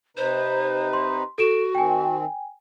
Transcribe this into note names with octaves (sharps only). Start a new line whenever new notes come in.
C3 D#4 B4 C5
C6
F#4 A4 D7 E7
D#3 C4 G5 G#5